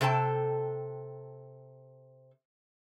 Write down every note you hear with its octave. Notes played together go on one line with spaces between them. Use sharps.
C3 A4 G5 A5